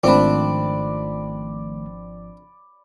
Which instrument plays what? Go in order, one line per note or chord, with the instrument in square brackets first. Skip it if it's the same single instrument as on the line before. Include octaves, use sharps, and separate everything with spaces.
[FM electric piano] G#1 F3 [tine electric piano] D#3 A3 [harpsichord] C4 D4 [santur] D5 B5